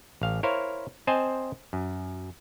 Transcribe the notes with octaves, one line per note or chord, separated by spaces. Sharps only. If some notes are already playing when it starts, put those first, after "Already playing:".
A1 F5
E4 A#4 C5 C#5 F5
C4 C5 D#5 G#5 A5
F#2